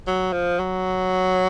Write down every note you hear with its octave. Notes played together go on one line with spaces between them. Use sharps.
F#3
F3
F#3